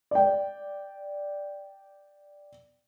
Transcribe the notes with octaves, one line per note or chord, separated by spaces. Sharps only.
D5 G5